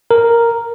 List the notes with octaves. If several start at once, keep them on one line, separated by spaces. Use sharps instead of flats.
A#4